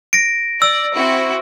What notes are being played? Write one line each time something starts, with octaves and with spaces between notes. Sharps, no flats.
A#6 D7
D5 E6
C4 E4 F#4